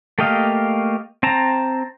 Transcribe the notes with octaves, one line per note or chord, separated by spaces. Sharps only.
A3 A#3 G4 D#5 F5
C4 A5 A#5